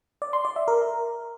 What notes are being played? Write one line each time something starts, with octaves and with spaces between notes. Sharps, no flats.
D5
C6
D5
E5
A#4